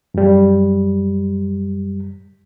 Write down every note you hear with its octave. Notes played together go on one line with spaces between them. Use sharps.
F#2 G3